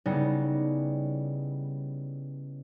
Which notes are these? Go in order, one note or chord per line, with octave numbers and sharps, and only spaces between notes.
C#3 G3 B3 D#4 E4